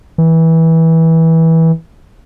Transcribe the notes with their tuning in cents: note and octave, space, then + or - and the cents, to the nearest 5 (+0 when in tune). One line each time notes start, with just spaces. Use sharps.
E3 -20